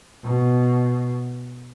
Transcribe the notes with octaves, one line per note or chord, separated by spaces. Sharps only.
B2